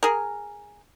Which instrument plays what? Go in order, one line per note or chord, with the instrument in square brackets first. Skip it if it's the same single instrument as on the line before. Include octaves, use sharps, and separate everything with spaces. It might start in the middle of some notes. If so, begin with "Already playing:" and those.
[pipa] G#4 A#4